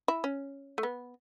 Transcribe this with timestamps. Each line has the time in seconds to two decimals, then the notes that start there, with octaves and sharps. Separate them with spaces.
0.08 E4
0.24 C#4
0.78 A3
0.83 B3